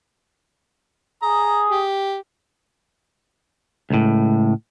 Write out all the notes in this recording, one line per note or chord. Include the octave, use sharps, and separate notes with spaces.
G#4 A#5 D#6
G4
C#2 A2